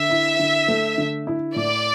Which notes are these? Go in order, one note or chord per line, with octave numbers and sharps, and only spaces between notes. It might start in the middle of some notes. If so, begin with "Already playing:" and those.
Already playing: D3 E5
E4
D3
A3
D3
E4
A2 D5